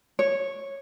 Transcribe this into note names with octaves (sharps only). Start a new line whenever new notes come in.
C#5